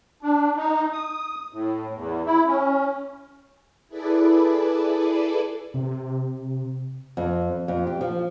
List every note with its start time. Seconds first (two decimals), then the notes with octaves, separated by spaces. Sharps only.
0.22 D4
0.56 D#4
0.93 D#6
1.53 A2
1.95 E2
2.26 E4
2.47 C#4
3.88 E4 G#4 A4 B4 D5
5.74 C3
7.17 F2
7.68 F2
7.87 G4
8.01 F3